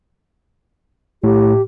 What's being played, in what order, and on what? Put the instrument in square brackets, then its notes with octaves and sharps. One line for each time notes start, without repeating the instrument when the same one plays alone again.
[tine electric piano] A2 [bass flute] G4